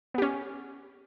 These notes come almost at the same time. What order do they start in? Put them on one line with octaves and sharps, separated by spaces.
B3 G4 C#4